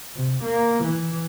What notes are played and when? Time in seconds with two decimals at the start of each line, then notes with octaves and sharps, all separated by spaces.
0.15 C3
0.43 A#3
0.84 E3